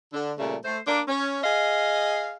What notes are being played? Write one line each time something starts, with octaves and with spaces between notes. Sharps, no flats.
D3
A#2 C#3 G3 A3
A3 C5
A#3 D4
C#4
G#4 D#5 F5